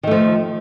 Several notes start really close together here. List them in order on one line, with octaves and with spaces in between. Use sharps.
D#3 A3 F3